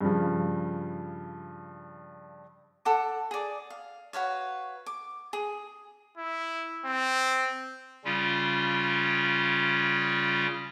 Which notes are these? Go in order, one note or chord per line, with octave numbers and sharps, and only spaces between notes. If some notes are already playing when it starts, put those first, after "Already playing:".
G2 C#3 F3
A4 F#5 D6
G#4 D5
F5
F#4 B4 C#5 F5
D6
G#4
E4
C4
C#3 G3 C#4 F4